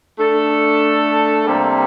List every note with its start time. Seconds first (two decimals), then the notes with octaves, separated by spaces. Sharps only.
0.19 A3 D4 A4
1.45 C3 G3 A#3